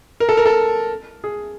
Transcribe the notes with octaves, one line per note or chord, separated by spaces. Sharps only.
A#4
A4
A#4
A4
G#4